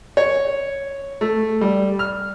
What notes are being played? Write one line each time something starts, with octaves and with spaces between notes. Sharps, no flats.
C#5
A3
G3
F6